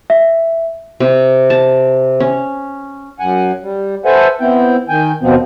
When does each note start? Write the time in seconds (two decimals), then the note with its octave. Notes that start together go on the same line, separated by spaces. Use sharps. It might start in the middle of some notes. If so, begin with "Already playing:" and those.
0.10 E5
1.00 C3
1.50 A5
2.20 C#4
3.20 F#2 F#5 G#5
3.63 G3
4.05 A4 B4 C5 E5 F#5 G#5
4.40 B3 C4 E4 G5
4.89 D#3 G5 G#5
5.21 D#2 B2 F3 B3 C4